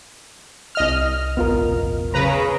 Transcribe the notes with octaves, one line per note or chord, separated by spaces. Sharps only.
C2 D#5 F6
E1 A1 B3 F4 A#4
C#3 B4 A#5